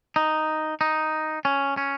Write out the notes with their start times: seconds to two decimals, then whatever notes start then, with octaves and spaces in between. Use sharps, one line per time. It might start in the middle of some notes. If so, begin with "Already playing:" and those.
0.16 D#4
0.81 D#4
1.45 C#4
1.77 C#4